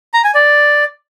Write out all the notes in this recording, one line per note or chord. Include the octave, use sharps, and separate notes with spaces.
A#5
G#5
D5